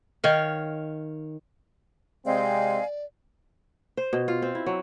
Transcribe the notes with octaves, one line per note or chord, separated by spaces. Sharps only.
D#3 C#5 F5
C3 G#3 C4 D5 D#5 F5 G#5
C5
B2
F4
C4
E4
F#3